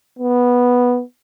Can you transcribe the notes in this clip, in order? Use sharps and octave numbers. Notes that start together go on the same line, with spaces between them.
B3